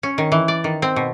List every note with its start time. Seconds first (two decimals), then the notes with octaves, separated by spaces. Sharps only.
0.03 C#4
0.18 D#3
0.32 E3
0.48 D5
0.64 D#3
0.82 C4
0.96 B2